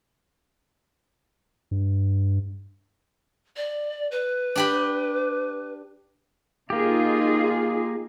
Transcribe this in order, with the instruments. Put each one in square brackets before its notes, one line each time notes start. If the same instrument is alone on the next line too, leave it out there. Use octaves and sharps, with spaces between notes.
[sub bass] G2
[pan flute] D5
B4
[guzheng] D4 G4 B5
[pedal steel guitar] A#3 G4 [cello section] D#4 F4 G#4